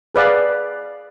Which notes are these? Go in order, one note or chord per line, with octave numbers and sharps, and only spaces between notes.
G#4 B4 D5 F5